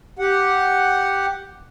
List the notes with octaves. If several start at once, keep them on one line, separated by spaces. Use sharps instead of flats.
G4 F#5